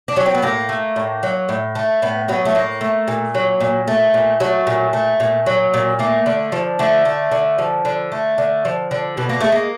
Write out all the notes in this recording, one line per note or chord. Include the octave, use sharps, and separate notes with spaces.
D4
F#3 C#4
C4
B3
A2 A#3
A3
A2
F#3
A2
A3
A2 B3
F#3 B3
A3
A2 A#3
A3
A#2
F#3
A#2
A3
A#2
F#3 A3
A#2
A3
A#2
F#3
A#2
A3 A#3
D3
F3
D3 A3
A3
D3
F3
D3
A3
D3
F3
D3
B2 B3
A#3
G#3 A3
A#3